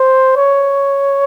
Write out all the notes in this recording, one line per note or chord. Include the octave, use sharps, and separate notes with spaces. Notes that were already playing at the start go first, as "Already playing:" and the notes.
Already playing: C5
C#5